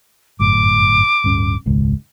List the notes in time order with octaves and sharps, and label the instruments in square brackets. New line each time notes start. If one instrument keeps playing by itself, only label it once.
[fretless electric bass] G1 F#2 A2 [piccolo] D6
[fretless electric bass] D1 G2 C#4
E1 C#2 G#2